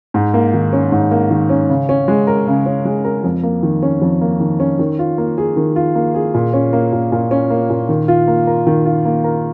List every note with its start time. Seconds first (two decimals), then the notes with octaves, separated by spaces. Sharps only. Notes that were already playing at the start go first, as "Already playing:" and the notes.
0.14 G#2
0.34 A#3
0.53 D#3
0.73 C#4
0.92 G#2
1.11 A#3
1.31 D#3
1.50 C#4
1.70 C#3
1.89 C#4
2.08 G#3
2.27 A#4
2.47 C#3
2.66 C#4
2.85 G#3
3.04 A#4
3.24 F2
3.43 A#3
3.63 D#3
3.83 C#4
4.02 F2
4.21 A#3
4.40 D#3
4.60 C#4
4.79 D#3
4.99 F4
5.18 A#3
5.38 G#4
5.57 D#3
5.76 F4
5.95 A#3
6.14 G#4
6.34 A#2
6.53 C#4
6.73 A#3
6.93 A#2
7.12 A#2
7.31 C#4
7.50 A#3
7.70 A#2
7.89 D#3
8.08 F4
8.28 A#3
8.47 A#4
8.67 D#3
8.85 F4
9.05 A#3
9.24 A#4